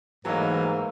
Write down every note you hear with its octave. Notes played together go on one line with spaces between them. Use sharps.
G#2 E3 F#3 A3 A#3 D#4